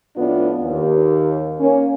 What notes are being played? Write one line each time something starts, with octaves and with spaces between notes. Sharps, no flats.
F2 A2 B3 D4 F4
D#2
A#3 C#4